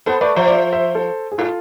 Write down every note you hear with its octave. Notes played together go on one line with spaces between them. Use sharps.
B3 A4 C5
A3 B4 D5
F3 C5 E5
D5
C5 E5
C5 E5
A4 C5
G#4
A2 F4 A4